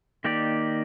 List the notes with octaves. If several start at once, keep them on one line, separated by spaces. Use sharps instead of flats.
D#3 A#3 D#4 G4 D5